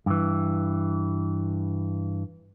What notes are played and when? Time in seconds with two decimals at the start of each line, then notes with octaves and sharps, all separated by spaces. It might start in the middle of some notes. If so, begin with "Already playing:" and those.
0.06 G2 E3